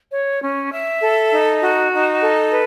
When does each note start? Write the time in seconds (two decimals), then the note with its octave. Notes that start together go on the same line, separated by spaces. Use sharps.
0.12 C#5
0.42 C#4
0.71 E5
1.02 A4
1.31 D#4
1.61 F#4
1.92 D#4
2.21 A4
2.51 B4